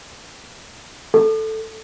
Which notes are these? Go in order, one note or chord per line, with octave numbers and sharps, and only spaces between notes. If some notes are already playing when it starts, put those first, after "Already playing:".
A4